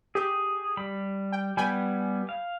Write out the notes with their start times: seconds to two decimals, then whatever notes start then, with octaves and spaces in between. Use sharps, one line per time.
0.15 G4 G#4
0.77 G3 B5
1.32 G5
1.57 G3 B3 G5 G#5 B5
2.29 F5